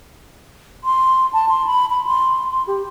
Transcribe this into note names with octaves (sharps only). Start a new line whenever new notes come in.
C6
A5
C6
B5
B5
C6
C6
G4